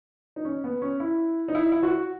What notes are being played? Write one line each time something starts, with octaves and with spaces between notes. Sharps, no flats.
D#4
C#4
B3
C#4
E4
D#4
E4
E4
F#4